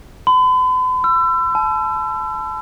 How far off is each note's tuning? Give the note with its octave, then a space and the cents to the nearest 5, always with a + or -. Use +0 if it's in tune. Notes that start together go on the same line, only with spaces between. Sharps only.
B5 +45
E6 +30
A5 -35